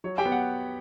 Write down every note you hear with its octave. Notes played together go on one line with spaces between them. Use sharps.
F#3 C#5
G4 G5
B3
F#5